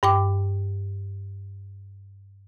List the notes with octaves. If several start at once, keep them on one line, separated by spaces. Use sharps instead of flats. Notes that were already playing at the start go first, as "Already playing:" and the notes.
G2 G5 D6